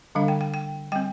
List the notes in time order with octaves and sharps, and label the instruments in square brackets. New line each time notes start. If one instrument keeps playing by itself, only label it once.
[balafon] D3 G3 D4 F5
G5
G5
G5
G3 C4 G5